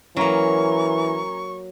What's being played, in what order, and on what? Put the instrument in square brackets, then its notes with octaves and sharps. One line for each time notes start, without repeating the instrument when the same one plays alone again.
[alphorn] E3 [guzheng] F#3 A#3 [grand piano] C#4 A#5 [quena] C#6